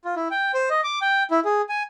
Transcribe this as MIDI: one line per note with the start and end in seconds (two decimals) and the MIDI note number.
0.05 0.15 65
0.16 0.28 64
0.31 0.52 79
0.54 0.69 72
0.70 0.81 75
0.84 0.99 86
1.02 1.23 79
1.31 1.40 64
1.45 1.62 68
1.69 1.83 80